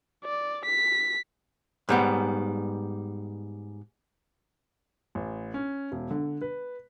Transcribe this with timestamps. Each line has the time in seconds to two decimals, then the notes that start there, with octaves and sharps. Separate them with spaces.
0.25 D5
0.65 B6
1.89 G#2 G3 B3
5.15 A1
5.54 C#4
5.92 E1
6.11 D3
6.41 B4